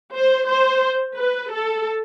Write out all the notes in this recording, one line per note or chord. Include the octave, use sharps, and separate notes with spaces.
C5
C5
B4
A4